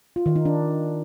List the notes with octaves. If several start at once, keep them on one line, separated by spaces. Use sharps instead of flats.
F4
D#3
D#4
D4